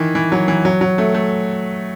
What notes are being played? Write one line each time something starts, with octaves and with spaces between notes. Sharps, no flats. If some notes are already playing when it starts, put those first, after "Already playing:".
Already playing: D#3 E3
E3
F#3
E3
F#3
F#3
A3
A3